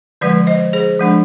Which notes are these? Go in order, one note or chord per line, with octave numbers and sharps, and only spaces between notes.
D3 F3 G#3 B4 D5
C5 D#5
G#4 C5
F3 G#3 D4